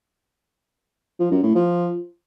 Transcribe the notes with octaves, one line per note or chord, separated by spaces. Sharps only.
F3
F#2
A2
F3